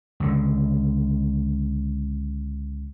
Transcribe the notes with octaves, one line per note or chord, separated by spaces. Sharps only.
C#2 D3